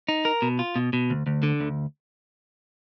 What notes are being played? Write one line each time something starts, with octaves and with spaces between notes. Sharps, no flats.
D#4
A#4
B2
F4
B2
B2
D2
D2
D3
D2